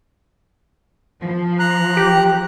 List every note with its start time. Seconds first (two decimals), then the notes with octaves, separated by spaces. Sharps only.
1.22 F3
1.59 A#5 F#6
1.97 G4